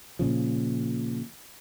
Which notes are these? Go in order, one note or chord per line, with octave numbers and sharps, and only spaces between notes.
A#2 C#3 F3